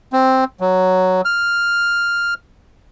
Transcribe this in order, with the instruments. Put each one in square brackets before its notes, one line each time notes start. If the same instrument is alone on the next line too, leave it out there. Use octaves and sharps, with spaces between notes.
[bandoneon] C4
F#3
F6